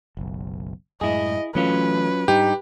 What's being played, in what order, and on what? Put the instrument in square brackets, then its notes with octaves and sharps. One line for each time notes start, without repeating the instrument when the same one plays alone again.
[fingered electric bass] F#1 B1
[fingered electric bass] F#2 A2 G#3 [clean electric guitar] E4 G#4 [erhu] D#5
[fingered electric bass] E3 A3 [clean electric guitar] F#3 C#4 F4 [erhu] B4
[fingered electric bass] G#2 G3 D4 [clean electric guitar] D#4 [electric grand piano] G4